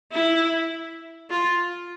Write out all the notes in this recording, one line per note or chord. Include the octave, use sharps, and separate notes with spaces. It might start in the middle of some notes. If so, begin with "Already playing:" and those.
E4
F4